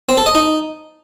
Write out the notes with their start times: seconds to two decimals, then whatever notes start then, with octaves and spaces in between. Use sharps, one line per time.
0.09 C4
0.17 A4
0.26 D#5
0.35 D#4